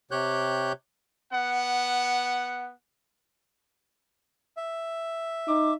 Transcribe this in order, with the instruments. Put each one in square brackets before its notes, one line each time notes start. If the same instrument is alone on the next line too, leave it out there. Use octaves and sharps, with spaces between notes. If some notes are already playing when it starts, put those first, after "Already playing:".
[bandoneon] C3 G4 C#5 F#6 G6
[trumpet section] B3 F#5
[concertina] E5
[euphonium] D#4 [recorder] D6